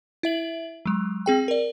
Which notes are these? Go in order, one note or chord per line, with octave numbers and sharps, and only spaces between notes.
E4 E5 F#7
F#3 G#3
C4 G#4 G5
A#4 D5